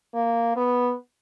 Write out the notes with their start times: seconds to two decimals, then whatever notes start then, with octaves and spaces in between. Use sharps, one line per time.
0.14 A#3
0.56 B3